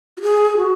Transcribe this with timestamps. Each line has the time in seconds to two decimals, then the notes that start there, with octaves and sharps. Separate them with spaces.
0.17 F#4
0.22 G#4
0.58 F#4